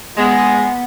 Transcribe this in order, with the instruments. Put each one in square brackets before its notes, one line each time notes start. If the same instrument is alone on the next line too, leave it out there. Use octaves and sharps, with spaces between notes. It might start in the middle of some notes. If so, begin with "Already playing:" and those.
[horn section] G#3 [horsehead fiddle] B3